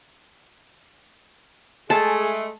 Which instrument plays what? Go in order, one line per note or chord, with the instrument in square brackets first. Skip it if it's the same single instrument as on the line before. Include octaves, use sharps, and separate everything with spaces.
[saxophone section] G#3 A3 [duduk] G#4 [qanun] A5